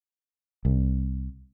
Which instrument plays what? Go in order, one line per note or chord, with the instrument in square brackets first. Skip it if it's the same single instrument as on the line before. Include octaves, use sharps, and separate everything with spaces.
[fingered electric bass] C2